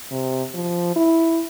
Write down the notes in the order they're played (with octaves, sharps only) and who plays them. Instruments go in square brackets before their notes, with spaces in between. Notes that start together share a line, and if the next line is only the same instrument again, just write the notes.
[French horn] C3
F3
E4